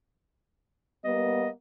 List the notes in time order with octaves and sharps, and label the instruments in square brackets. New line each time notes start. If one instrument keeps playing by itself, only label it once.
[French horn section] G3 A#3 B3 [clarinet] D#5